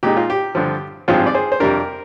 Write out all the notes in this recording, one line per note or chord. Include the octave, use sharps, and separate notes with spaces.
A#2 G#3 D#4 G4
F4
G4
G2 D3 F3
G#1 G2 F3 C4 F4 G#4
D5
G#4 C5
C5
F2 C3 G3 D4 G4 A#4